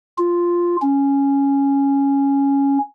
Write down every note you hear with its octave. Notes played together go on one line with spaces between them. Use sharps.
F4
C#4